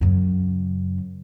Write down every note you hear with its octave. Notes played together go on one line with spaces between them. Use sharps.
F#2 C#3